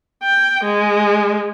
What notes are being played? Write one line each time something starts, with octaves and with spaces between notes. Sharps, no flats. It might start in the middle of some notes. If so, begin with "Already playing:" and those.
G5
G#3